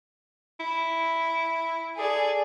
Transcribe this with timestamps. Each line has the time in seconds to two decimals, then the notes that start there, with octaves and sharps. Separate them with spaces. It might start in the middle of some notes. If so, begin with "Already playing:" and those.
0.60 E4
1.97 G#4 A4 D5 G#5